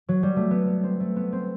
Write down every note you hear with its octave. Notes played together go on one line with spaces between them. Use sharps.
F#3
G3
A3
B3
B3
C4
A3
B3
C4